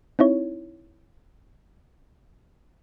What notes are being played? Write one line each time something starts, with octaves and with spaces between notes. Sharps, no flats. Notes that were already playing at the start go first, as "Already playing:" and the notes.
C4 D#4 E4 C#5